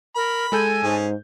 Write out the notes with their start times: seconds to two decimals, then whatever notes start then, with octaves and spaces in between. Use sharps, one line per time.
0.16 A#4 B5
0.52 G#3 A4 G#5 G6
0.84 G#2 C#4 G#4